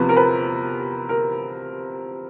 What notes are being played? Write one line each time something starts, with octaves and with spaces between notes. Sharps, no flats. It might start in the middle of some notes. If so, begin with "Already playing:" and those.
Already playing: E2 C3 F3 B4
A#4
B4
A#4